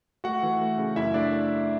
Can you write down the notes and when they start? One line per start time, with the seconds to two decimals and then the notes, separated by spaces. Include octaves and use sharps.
0.24 A3 F#4 F#5
0.43 E3
0.61 A3
0.78 C#3
0.96 F#2 E4 E5
1.14 A3 D4 D5